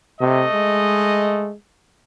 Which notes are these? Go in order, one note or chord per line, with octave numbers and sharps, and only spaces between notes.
C3 A3 D#5
G#3